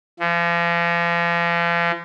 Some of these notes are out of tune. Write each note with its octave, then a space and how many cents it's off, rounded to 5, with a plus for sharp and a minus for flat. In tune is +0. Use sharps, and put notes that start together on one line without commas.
F3 -40